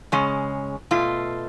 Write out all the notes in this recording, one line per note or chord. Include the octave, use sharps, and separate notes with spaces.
C#3 G#3 C#4
B2 A3 F4